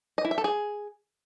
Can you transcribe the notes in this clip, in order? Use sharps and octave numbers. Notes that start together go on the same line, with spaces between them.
D#5
E4
E5
A4
G#4